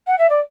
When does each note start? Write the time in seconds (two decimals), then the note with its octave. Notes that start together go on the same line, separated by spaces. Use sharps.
0.07 F#5
0.18 E5
0.30 D5